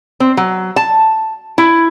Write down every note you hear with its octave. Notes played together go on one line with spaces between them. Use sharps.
C4
F#3
A5
E4